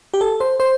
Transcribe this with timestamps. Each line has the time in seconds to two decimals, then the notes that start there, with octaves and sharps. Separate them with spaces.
0.14 G4
0.21 A4
0.40 C5
0.60 C5